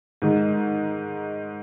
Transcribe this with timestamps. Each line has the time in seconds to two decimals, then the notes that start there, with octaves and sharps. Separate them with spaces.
0.22 G#2 D#3 G#3